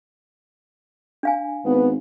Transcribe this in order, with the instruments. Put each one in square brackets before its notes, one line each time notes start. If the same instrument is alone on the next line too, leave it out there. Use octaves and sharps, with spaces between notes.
[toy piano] D4 F5 G#5
[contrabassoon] G#1 [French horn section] B3